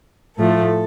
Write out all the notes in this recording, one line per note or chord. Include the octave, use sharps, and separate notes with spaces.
A2 F3 A3 A4